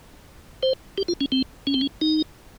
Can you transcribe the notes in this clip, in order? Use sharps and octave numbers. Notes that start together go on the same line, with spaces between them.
C5
G4
F4
C#4
C4
C#4
C4
C#4
D#4